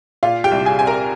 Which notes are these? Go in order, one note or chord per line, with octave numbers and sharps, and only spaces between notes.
A#2 F4 F5
G4 G5
C2
G#4 G#5
C4 G#5
A#4 A#5